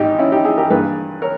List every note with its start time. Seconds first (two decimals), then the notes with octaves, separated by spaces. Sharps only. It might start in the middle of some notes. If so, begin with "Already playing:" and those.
Already playing: G#1 G#2 D#4 G4
0.19 C#4 E4
0.32 D#4 G4
0.44 E4 G#4
0.58 G4 A#4
0.70 G2 E3 A#3 G#4 B4
1.22 A#4 C#5